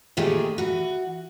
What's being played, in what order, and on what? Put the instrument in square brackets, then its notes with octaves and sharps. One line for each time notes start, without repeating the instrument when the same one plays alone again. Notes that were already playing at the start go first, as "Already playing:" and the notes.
[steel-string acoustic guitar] A#2 D#3 A3 G4 G#4
E3 F#4